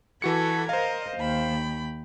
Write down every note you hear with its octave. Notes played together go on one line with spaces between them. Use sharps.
E3 F#4 A4 B5 G#6 C#7
A#4 C5 D#5 F5
D#2 G5 B5